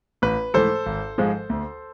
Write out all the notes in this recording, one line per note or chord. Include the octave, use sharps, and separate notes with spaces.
A1 B4
G#2 E3 A3 A4 C5
G#1
G#2 F3 G#3
D2